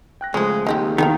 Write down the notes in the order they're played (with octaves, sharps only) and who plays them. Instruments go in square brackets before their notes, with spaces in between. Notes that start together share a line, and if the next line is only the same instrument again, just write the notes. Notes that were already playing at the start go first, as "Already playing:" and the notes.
[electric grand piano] G5 F#6 A#6
[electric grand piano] C#3 F3 A3 [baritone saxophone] G#3 [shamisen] C#4 C5
[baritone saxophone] D#2 [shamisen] G#3 C4 G4
[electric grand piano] E2 [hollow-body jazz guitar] D#3 [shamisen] B3 A4 F5